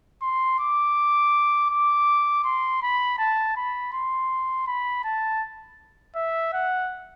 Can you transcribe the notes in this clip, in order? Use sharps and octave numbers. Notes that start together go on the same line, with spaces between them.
C6
D6
D6
C6
B5
A5
B5
C6
B5
A5
E5
F#5